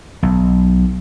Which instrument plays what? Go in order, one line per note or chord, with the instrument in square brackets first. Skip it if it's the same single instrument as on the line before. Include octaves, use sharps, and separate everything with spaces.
[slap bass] B1